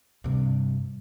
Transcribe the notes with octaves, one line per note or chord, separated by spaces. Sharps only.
G2 C3